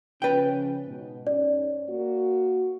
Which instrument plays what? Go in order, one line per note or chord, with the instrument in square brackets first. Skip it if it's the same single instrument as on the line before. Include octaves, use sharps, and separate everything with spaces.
[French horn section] C#3 F3 C#4 [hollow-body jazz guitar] B4 G5
[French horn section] G#2 B2
[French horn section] G#2 C#4 [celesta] D5
[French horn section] A#3 F#4